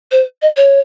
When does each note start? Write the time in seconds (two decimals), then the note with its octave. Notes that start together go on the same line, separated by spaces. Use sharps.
0.12 C5
0.42 D#5
0.57 C#5